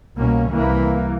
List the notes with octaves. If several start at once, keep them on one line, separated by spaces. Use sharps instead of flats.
C2 B2 A#3 C#4
C2 E3 A#3